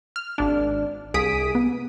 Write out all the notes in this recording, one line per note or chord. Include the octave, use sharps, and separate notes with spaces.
F6
G#1 D4
C2 G#4 D#6 B6 D7
B3